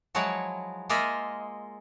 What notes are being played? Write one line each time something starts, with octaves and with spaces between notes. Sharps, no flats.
F3 F#3 G#3 E4 F#4 C#5
G#3 A#3 F4 D#5 E5